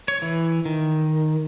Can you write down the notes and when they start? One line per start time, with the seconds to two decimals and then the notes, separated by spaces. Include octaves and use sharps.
0.08 C#5
0.22 E3
0.65 D#3